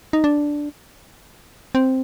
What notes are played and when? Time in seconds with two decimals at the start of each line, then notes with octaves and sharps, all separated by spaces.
0.13 D#4
0.24 D4
1.75 C4